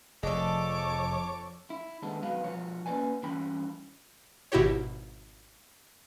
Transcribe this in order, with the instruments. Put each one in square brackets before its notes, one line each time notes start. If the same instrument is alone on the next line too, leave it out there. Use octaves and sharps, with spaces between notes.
[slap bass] F1 [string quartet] F2 C#5 D6 [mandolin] D4 A4 [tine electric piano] G#4 D#5
[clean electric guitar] E4
D#2 D3 G#3 B3 A4
B1 F#3 B3 B4 F5
B2 F3 C#5
A#3 C#4 D#4 B4 D5 G#5
G2 E3 C#4 G5 B5
[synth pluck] G#1 B2 E4 F#4 G4 C#5